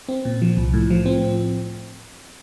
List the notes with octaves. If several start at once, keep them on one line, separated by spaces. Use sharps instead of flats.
C4
A#2
F3
C2
A2
F3
C4